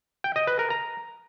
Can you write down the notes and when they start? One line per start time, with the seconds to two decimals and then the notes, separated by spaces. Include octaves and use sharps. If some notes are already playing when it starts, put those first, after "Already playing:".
0.24 G5
0.36 D#5
0.47 B4
0.59 A#4
0.70 A#5